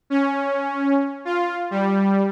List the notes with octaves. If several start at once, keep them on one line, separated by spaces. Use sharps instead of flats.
C#4
F4
G3